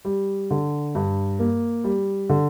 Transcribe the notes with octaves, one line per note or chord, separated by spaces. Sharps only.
G3
D3
G2
A#3
G3
D3